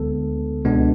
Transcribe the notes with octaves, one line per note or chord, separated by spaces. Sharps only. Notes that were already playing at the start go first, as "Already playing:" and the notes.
Already playing: D2 D3 G#3 B3 A4
C#2 B2 G#3 B3 D4